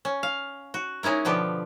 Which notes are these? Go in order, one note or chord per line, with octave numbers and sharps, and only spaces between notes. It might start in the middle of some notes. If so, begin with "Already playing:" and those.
C#4
F5
F#4
G#3 C#4 D#4 E4 A#4
B2 D3 F3 B3 G4